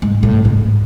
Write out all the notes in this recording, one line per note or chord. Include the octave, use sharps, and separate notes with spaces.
G#2
A2
G#2